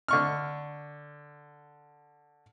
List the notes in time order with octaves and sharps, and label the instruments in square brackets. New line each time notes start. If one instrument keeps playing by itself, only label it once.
[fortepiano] D3 C#6 F6